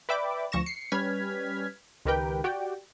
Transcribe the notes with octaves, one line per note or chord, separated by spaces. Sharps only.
B4 D5 E5 G5 B5 D6
D2 F3 C#6 A#6 E7
C7 C#7
G3 C#4 B4 F6 G#6 B6
C#2 D#3 G4 A#4 B4 G5
F#4 G4 D5 G5